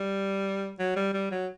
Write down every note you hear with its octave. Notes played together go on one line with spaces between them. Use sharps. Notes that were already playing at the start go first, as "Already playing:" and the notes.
Already playing: G3
F#3
G3
G3
F#3